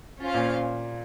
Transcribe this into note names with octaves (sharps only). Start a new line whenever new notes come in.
C#4 F4 C5 F5
A#2